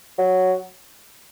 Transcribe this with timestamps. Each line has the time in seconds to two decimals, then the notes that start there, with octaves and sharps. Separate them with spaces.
0.18 F#3